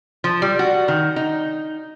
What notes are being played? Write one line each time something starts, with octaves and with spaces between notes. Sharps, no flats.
F3
G3
F#4
D#3
D#4